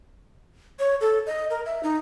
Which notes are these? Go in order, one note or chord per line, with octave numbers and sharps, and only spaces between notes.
C#5
A4
D#5
A#4
E5
D#4